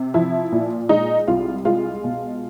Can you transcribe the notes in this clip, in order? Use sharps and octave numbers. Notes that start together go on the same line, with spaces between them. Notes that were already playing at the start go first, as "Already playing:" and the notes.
Already playing: C3
F3 E4
A#2
G#3 D#4
C2 F4
G#3 F4
B2